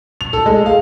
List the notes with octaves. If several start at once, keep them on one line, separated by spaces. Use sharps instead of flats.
F7
A4
G#3
F5